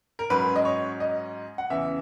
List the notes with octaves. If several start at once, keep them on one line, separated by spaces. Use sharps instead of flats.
A#4
G#2 F#3 C#4 B4
D#5
C#5
D#5
F#5
E2 C#3 E3 E5